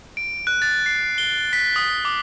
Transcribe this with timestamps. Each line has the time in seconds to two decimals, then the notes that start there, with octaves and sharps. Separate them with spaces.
0.17 D7
0.47 F#6
0.62 A6
0.86 C7
1.18 G7
1.53 B6
1.76 D#6
2.05 D6